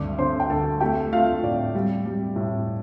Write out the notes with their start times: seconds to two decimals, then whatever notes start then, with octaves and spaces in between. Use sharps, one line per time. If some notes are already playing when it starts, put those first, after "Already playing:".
Already playing: D2 G2 D5 D6
0.18 D3 C5 C6
0.40 G5
0.50 D2 A4 A5
0.80 A3 G4 G5
1.12 A3 F4 F5
1.43 A2 D5
1.75 G3
2.06 G3
2.36 A2